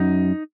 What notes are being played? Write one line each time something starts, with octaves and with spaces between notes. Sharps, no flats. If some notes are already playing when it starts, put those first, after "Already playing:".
Already playing: F#2 D#4